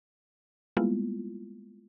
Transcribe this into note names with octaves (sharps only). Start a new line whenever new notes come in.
G3 G#3 A#3 B3 E4 F4